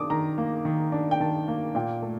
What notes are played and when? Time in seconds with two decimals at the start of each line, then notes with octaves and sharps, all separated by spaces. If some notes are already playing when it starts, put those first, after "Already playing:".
Already playing: D#3 D4 D6 D#6
0.10 D#3 A#5
0.38 A#3
0.65 D#3
0.92 D4
1.11 G5
1.20 D#3 A5
1.48 A#3
1.75 A#2 G5
2.02 A3